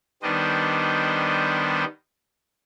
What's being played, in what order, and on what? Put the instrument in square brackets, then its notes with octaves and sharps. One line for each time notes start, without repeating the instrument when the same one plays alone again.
[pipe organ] D#3 G3 B3 D4 C5 D#5